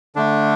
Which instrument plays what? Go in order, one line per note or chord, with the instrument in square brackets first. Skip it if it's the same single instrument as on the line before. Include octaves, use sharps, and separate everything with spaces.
[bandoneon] D3 A3 D4